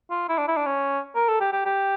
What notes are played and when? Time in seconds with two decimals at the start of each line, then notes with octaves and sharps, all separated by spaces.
0.10 F4
0.29 E4
0.38 D4
0.48 E4
0.57 D4
0.66 C#4
1.15 A#4
1.28 A4
1.40 G4
1.52 G4
1.65 G4